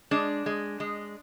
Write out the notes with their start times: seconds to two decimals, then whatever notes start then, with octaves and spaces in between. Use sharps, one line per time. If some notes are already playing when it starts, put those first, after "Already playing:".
0.11 G#3 D4
0.46 G#3
0.80 G#3